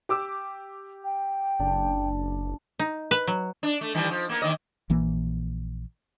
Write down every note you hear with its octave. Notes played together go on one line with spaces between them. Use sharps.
G4 D6 E6
G5
F#1 D4
D#4
B4
F#3
D4
A3
D#3 E3 G3
F3
A#3 B3
D#2 D#3 D#5
A#1 E3 A#3